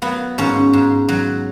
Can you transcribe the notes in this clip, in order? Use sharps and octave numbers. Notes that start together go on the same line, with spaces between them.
F#3 B3
G#2 C#4
G#2
F#3